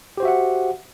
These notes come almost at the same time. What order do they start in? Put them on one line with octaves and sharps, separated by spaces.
G4 C5 F#4 E5 F#5